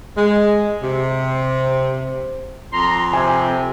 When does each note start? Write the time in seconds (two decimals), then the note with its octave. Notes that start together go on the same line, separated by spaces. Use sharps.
0.17 G#3
0.82 C3
2.73 F2 A#5 C6
3.13 C3 G#5